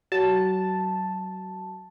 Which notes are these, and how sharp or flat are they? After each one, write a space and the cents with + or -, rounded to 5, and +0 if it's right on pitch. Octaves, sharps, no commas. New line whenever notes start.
F#3 +25 A5 +0